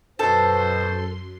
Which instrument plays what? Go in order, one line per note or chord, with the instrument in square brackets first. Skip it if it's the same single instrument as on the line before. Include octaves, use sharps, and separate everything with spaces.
[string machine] F#2 C6 [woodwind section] B2 C5 [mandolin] A4